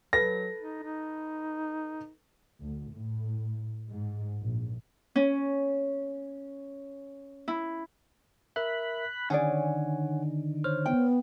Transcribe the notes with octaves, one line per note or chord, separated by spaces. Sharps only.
F#3 A4 B4 A#6
D#4
D#4
D2
A2
G#2
A#1
C#4
E4
A#4 E5 B5 F#6
D3 D#3 C#4 G#4 C#5 D5 F#5 G#5
C5 C#5 F6
B3 G5